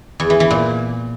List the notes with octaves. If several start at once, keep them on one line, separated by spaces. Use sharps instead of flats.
E2
E3
E3
A#2